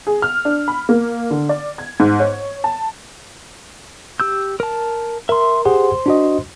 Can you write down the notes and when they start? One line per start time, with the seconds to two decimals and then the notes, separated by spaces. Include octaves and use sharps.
0.07 G#4
0.22 F6
0.45 D4
0.68 B5
0.89 A#3
1.31 D3
1.49 D5
1.78 G#6
2.00 G#2
2.20 C#5
2.64 A5
4.20 G4 E6 G6
4.60 A#4 A5
5.29 A#4 E5 C6
5.65 G4 G#4 C5 F#5
6.06 D4 F#4 D#5